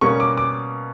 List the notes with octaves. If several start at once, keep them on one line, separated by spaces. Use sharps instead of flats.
B2 G3 A#3 C#4 C#6
D6
D6